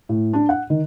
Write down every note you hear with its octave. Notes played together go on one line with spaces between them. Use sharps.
A2
D4
F#5
D#3